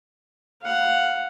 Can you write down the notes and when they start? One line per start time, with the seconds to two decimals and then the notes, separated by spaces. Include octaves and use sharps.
0.62 F5 F#5